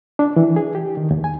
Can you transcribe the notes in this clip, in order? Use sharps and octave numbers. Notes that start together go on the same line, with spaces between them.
D4
E3
G#4
G4
D#3
D#2
G#5